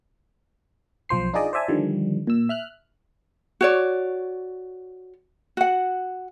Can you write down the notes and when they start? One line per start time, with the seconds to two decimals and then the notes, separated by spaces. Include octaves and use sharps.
1.09 B1 F3 C5 C7
1.33 D4 D#4 F4 G#4 D5 D#5
1.53 C5 D5 E5 G#5 A5
1.68 D3 D#3 F3 G3
2.27 A#2 E6
2.49 E5 F6 F#6
3.61 F#4 C#5 D5
5.57 F#4 F#5